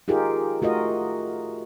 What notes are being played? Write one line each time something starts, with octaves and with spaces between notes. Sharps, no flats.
D#4 F4 G4 G#4 A#4
A3 F4 F#4 A#4 D#5